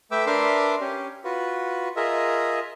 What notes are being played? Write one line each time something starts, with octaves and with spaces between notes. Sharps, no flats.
A3 B4 E5 G5 D6 E6
D4 A#4 B4 E5 C6 D6
C#4 G4
F4 F#4 B4
F4 G#4 A#4 D#5 E5